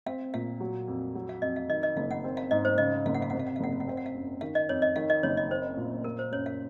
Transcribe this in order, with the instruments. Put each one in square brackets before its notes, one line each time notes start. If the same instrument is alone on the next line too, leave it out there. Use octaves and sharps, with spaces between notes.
[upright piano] C4 [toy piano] F5
[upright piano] A#2 [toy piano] F5
[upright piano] F#3
F2
F#3
[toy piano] F5
[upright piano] F2 [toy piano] D#5
[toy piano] F5
[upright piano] D#3 [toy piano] D#5
[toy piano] D#5
[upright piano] F#1 [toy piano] F5
[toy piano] F#5
[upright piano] C4
[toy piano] F5
[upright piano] G#2 [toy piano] D#5
[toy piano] C5
[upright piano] C#3 [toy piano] D#5
[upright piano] F#1 [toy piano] F5
[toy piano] F#5
F5
[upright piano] C3 [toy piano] F#5
[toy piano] F5
F#5
F5
[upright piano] F#1 [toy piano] F#5
[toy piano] F5
F#5
[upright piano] C4 [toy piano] F5
[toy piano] F#5
F5
[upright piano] F#2
[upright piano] D#3 [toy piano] F5
[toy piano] D#5
[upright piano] F2 [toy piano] C#5
[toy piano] D#5
[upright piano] D#3 [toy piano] F5
[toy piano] D#5
[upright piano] F#1 [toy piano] C#5
[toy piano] D#5
[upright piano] C4 [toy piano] C5
[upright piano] A#2
[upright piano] A#3 [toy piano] A#4
[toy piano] C5
[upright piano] F#2 [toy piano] C#5
[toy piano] F5